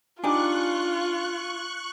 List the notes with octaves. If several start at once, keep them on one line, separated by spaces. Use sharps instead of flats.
D4 D#4 F4 G4 G#5 C#6 D6 F#6